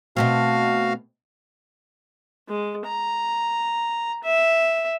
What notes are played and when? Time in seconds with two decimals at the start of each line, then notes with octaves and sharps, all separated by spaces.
0.17 B2 A3 C4 F#4 F5 F6
2.48 G#3
2.87 A#5
4.24 E5